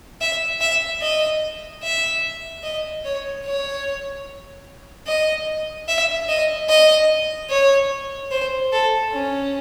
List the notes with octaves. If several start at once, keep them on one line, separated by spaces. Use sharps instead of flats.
E5
E5
D#5
E5
D#5
C#5
C#5
D#5
E5
D#5
D#5
C#5
C5
A4
C#4